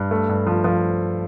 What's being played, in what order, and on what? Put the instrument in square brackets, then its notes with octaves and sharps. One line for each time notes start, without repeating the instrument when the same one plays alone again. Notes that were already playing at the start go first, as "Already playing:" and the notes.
Already playing: [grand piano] G2
A3
G2
F3
F3